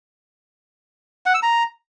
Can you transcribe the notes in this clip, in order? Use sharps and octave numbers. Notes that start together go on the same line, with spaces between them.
F#5
E6
A#5